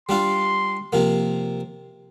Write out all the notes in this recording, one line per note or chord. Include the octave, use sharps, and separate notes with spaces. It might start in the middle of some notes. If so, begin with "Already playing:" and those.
G3 D4 F4 C6
C3 F3 A#3